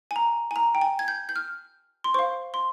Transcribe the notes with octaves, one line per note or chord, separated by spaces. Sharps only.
G#5
A#5
G#5
A#5
G5
G#5
G#6
G6
G6
F6
C6
C5 F5 C#6
C6